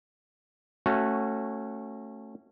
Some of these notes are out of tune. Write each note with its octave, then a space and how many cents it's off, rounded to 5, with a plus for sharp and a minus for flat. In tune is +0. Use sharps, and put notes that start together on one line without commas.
A3 +10 C#4 -20 F#4 +0